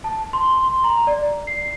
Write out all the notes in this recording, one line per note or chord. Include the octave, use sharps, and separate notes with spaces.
A5
C6
C6
A#5
D5
C7